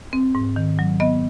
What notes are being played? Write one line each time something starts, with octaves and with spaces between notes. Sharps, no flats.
C4
G#2
D#3
F#3
B3 D#5